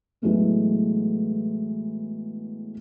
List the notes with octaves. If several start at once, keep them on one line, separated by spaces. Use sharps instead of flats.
A2 E3 F#3 G#3 A3 B3